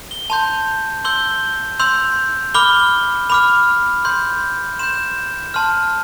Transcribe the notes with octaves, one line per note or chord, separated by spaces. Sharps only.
G7
A5 C6 G6 F7
C6 E6 G6 G7
C6 E6 G6 F7
B5 D6 F6 G7
B5 D6 F6 F7
C6 G6
C6 G6 E7
A5 C6 F6